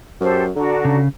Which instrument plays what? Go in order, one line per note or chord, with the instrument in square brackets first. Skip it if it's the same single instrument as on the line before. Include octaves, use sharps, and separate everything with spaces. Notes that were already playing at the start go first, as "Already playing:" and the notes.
[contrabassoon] F#2 [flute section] G4 A4 C5
[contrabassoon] D3 [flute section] D4 F#4 A#5
[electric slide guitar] C#3